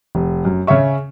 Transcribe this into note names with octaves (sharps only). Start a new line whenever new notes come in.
F1
F#2
C#3 C#4 C#5 E5 C#6